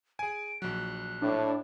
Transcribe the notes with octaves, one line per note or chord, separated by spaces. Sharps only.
G#4 G#5 D7
A#1 F#3 F#6
A2 D4